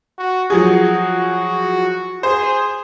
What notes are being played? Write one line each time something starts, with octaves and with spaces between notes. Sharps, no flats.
F#4
F3 F#3 F#4 G#4
G#4 C5